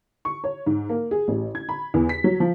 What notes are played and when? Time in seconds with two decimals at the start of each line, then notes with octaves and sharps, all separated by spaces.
0.25 C#6
0.44 C#5
0.66 G#2
0.89 A#3
1.11 G#4
1.28 A1
1.55 G#6
1.69 B5
1.94 E2
2.09 B6
2.24 F#3
2.40 F3